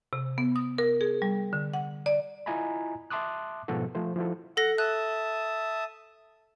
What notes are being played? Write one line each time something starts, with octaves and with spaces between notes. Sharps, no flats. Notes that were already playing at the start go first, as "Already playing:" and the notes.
C3
B3
D#6
A#4
G#4
G3
D3
F#5
D5
E4 F4 D#5 G#5 A#5 B5
E5 A5 C6 D6 D#6 F#6
G#2 B2 F3 F#4 A4
F3 A3 C5
F3 E4 F#4 A4
A4 F#5 A#6
E5 A5 D#6 F#6